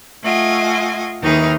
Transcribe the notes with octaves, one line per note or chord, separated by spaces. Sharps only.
A3 F4 D#5 F#5 G#5
D#2 D#3 E3 D#4 G#4 F6